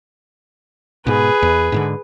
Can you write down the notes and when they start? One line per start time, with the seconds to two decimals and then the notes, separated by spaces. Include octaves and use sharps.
1.07 G#2 B2 G#4 B4
1.42 E2
1.72 G#2 B2 D3